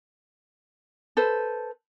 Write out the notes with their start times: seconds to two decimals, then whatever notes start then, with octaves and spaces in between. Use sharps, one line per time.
1.17 A4 B4 C5